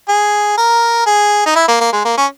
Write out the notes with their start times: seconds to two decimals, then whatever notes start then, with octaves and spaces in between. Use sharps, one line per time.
0.09 G#4
0.57 A#4
1.06 G#4
1.46 D#4
1.56 E4
1.68 A#3
1.81 A#3
1.93 G#3
2.05 A#3
2.17 C#4